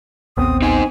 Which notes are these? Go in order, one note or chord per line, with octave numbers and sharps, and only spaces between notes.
A1 D#2 B3 C4 D#6
D#4 C5 G#5